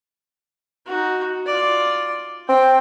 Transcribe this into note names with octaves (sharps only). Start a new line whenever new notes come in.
D#4 F#4
F4 D5
C4 G5